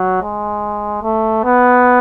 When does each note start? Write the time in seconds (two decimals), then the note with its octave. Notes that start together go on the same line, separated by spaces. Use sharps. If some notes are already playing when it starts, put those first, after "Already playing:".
Already playing: F#3
0.23 G#3
1.03 A3
1.44 B3